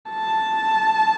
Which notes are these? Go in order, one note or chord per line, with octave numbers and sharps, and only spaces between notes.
A5